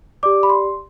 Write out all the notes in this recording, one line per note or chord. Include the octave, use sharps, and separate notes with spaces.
G4 D5 D6
B5
C6